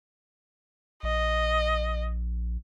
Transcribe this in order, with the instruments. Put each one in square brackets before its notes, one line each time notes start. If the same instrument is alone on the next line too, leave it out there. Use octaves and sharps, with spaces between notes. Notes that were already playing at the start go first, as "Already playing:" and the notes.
[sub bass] A#1 [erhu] D#5